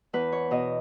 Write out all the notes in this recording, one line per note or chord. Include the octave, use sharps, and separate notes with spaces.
E2 B4
C#5
B2 D#5